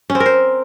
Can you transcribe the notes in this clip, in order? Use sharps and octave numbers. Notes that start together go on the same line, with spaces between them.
C#4
C4
A#4
C5